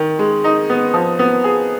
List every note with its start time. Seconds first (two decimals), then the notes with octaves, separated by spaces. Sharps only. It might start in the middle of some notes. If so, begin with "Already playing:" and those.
Already playing: D#3
0.19 G#3
0.44 D#4
0.69 B3
0.94 F3
1.19 B3
1.44 G#4